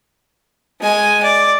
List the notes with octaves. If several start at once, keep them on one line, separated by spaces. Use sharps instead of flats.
G#3 G#5
D5